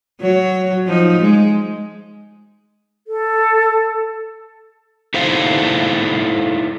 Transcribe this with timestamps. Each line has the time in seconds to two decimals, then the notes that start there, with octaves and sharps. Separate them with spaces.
0.20 F#3 C#5
0.86 F3 D#4
1.21 G#3
3.07 A4
5.14 D#4 E4 A4 C5 F5